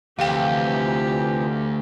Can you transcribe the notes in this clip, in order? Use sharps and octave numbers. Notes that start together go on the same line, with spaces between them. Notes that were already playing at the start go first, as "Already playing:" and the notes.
D2 C3 E3 F3 G4 F5 G5